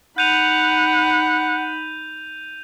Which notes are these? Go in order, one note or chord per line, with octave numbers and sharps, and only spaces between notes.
D#4 F#5 B5 G6 D#7 F7